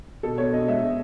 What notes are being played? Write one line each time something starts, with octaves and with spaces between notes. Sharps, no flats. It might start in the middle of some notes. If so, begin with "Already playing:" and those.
B2 A4
B3 C#5
B2 D#5
G#3 E5
B2